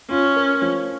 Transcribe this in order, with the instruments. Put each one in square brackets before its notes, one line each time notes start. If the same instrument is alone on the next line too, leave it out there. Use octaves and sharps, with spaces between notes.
[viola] C#4 [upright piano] F4
[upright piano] A#4
F3